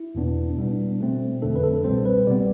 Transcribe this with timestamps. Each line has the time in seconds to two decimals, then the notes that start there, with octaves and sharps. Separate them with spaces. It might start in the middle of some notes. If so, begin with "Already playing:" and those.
Already playing: E4
0.15 E2 B2 B3 D4
0.57 B2 G3 B3 D4
0.99 B2 A3 C4
1.42 F2 D3 A3 D4 A4
1.56 B4
1.63 A4
1.84 C2 B2 G3 C4 C5
2.06 B4
2.27 C3 G3 B3 D5